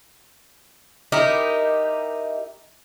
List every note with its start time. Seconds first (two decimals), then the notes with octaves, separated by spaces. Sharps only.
1.12 D#4 E4 G4 A#4